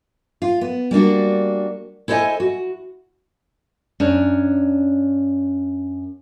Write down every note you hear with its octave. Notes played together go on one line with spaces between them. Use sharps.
F4
B3
G3 A#3 D4 F#4
E4 A4 C5 C#5 D#5 G#5
F#4
F#2 C#4 D4